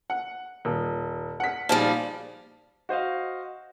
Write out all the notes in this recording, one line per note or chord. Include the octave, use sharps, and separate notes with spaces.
F#5
D#1
F#5 B6
A#2 F3 G3 D#4 G#4 A5
F#4 C5 D#5 F5